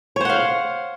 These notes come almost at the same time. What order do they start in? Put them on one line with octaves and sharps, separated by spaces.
C#5 C5 F#5 F5